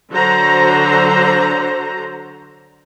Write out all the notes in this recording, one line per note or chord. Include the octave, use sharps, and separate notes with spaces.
D3 F#3 F#4 C5 A#5